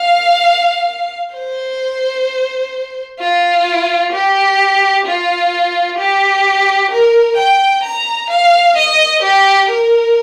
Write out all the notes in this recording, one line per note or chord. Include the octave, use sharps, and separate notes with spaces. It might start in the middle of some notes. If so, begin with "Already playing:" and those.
Already playing: F5
C5
F4
G4
F4
G4
A#4
G5
A#5
F5
D#5
G4
A#4